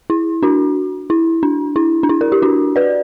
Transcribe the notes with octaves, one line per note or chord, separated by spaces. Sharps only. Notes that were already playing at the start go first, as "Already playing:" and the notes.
E4
D4 F#4
E4
D4
E4
D4
E4
A#4
G4
D4 F#4
B4 D5